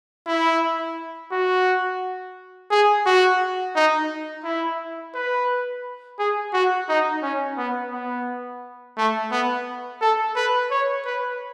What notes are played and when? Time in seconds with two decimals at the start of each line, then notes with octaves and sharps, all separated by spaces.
0.27 E4
1.32 F#4
2.71 G#4
3.06 F#4
3.76 D#4
4.44 E4
5.15 B4
6.19 G#4
6.54 F#4
6.89 D#4
7.22 C#4
7.58 B3
7.92 B3
8.97 A3
9.31 B3
10.01 A4
10.36 B4
10.71 C#5
11.05 B4